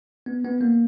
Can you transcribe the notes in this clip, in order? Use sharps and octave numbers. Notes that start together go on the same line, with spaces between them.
B3
B3
A#3